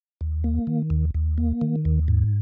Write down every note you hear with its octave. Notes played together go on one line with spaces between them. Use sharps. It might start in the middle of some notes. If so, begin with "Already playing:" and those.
D#2
A#3
D#3
D#2
D#2
A#3
D#3
D#2
G#2